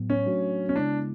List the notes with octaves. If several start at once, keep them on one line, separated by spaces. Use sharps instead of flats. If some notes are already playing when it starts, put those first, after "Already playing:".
Already playing: A2 F#3 B3
C#4
F#3 A3 D4 F#4
C#4
C#3 G#3 B3 D4 E4